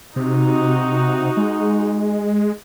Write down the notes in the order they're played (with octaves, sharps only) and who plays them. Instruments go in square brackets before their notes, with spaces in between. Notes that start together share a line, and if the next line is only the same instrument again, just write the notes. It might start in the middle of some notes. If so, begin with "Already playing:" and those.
[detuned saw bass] C3 [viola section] D#4 F#4
[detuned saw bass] G#3